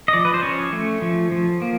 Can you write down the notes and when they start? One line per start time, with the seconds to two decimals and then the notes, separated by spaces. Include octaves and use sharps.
0.08 D#5
0.13 F3 D5
0.25 B4
0.34 C5
0.43 C#4 C#5
0.73 A3
1.02 F3
1.32 F3
1.62 A#3